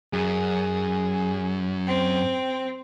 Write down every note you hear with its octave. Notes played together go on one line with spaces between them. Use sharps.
F#2 G#4
C4 G5